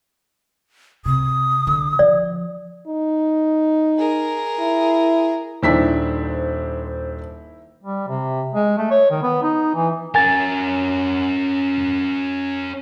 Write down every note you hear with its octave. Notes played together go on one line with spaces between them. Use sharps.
C3 D#6
D3
F3 D5
D#4
G#4 A#4
E4
D#1 D#3 D4 E4 C5 B6
G3
C3
G#3
A3
C#5
D#3
B3
D#4
E3
C#4 A#4 G#5 A6